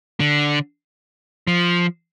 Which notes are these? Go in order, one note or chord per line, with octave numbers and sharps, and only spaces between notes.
D3
F3